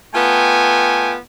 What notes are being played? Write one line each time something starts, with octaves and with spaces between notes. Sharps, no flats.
A3 B3 F4 G5 G#5